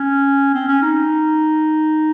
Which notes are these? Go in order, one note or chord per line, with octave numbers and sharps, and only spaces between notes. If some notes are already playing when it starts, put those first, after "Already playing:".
Already playing: C#4
C4
C#4
D#4